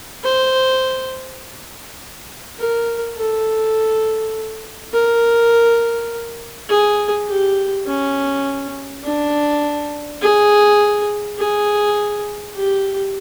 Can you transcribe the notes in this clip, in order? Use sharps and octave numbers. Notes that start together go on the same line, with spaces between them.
C5
A#4
A4
A#4
G#4
G4
C#4
D4
G#4
G#4
G4